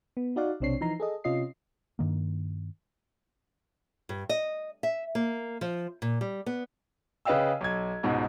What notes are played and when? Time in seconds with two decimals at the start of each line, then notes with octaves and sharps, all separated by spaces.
0.17 B3
0.36 D#4 F#4 D5 F5 F#5
0.60 B1 C3 C4 D4 C#5 C7
0.81 E3 F3 D#4 A#5 C7
1.00 G#4 A4 D#5
1.24 C3 C#4 F4 D#5 C7
1.99 G2 D#3 A#3
4.09 G2
4.29 D#5
4.83 E5
5.15 A#3
5.61 F3
6.02 A#2
6.21 G3
6.46 B3
7.25 C#3 B4 D#5 F5 G5 E6
7.61 B1 G#6
8.03 C#2 G#2 B2